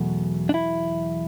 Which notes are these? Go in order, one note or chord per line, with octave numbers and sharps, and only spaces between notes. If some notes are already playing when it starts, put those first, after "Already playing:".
Already playing: E2 B2 F#3 A3
D4
E4